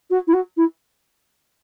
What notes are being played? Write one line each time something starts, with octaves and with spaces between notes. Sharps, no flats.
F#4
E4
F#4
E4